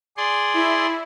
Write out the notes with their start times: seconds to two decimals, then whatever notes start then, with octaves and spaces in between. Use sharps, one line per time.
0.17 G#4 D5 C6
0.54 E4